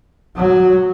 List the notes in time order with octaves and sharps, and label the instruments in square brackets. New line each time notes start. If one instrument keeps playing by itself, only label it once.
[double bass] F#3